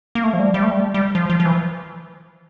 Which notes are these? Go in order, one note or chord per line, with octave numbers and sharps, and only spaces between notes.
A#3
A3
F3
G3
G3
A3
G3
G3
F3
F3
F3
E3